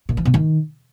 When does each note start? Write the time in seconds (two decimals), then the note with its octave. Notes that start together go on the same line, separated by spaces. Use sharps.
0.09 A#2
0.17 E3
0.25 B2
0.34 D#3